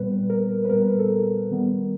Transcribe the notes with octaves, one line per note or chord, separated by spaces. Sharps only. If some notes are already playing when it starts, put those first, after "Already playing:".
Already playing: A#2 G3 B3 B4
A#4
B4
A#2 G3 B3 A#4
A4
A#4
D#3 G3 B3